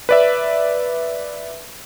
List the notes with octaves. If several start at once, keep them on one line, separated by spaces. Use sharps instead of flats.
B4 D5 E5